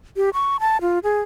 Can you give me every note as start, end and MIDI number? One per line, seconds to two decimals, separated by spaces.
0.16 0.30 67
0.34 0.57 85
0.60 0.81 81
0.81 0.99 65
1.03 1.21 68